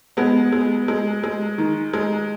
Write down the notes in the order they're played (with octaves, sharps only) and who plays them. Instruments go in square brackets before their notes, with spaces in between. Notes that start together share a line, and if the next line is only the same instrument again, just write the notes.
[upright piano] G#3 B3
G#3
G#3
G#3
D#3
G#3